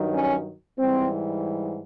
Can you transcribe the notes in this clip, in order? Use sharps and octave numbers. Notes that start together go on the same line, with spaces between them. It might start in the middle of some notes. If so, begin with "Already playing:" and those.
Already playing: G2 D#3 F#3
C#4
G#2 E3 G3 C4